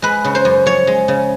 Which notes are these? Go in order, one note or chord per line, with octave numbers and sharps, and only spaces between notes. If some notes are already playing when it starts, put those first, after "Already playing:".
G#3 B4
C#3
C5
F#2
F3 C#5
G#3
C#3